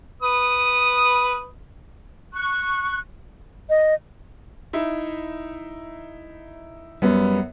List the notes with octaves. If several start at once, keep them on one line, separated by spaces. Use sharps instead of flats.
B4 D#6
C#6 F#6
D#5
D#4 E4 E5
F#2 G3 B3